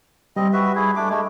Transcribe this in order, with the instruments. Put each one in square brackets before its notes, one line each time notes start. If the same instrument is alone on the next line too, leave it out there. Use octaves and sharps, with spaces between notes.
[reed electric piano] G3 [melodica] C4 D#5
[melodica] F#4 B4 E5
E4 G#4
A3 D4 D6
G#3 A3